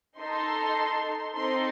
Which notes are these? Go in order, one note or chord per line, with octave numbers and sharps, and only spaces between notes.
D#4 A4 C6
C4 D#4 A4 C6